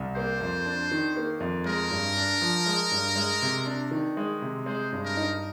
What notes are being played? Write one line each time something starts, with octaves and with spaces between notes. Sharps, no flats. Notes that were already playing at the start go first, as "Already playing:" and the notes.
Already playing: C2
A#3 C5
F2
D4
D#3
A#3
F2
G#3 A#4
G2
D4
F3
G#3
G2
G#3
C3
D4
D#3
G#3
C3
G#3 C5
G2
A#4
D#4